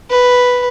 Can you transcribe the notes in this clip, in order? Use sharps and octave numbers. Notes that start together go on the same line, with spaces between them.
B4